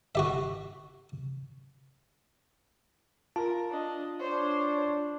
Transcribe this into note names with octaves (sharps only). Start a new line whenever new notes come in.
F#4 G4 E5
F4 A#4 A5
D4 D#5
D4 C5 C#5